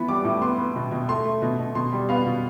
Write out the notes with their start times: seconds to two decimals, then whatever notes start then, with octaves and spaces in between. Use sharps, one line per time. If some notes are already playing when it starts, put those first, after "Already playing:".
Already playing: E3 B3 B5
0.08 G3 D6
0.24 A2
0.42 B3 C6
0.58 B3
0.76 B2
0.91 B2
1.08 A3 C6
1.25 A3
1.42 B2
1.59 B2
1.75 B2 C6
1.93 G3
2.09 B3 F5
2.26 B2